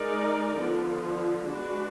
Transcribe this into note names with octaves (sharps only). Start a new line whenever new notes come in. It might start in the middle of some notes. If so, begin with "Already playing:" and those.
Already playing: G#3 D#4 A#4 D5
D3 F3 B3
G#3 D4 F#4 B4